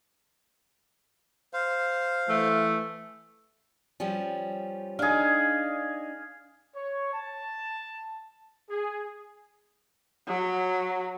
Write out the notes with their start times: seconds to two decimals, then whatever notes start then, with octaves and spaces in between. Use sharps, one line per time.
1.53 C5 F5
2.29 E3 A3
4.00 F3 G3 C#4
4.99 D4 D#4 G#4 F5
6.75 C#5
7.13 A5
8.70 G#4
10.28 F#3